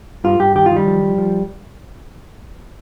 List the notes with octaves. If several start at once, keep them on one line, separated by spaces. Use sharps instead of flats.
G2 F4
G2 G4
D#3 G4
F4
D#3
G3
F3
F3
F3